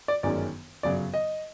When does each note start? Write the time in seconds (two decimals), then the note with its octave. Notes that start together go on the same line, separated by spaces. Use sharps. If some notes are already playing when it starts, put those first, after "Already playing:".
0.08 D5
0.23 G1 F#2 D#3 G#3 C#4 D5
0.83 G1 F#2 C#3 F#3 D5
1.14 D#5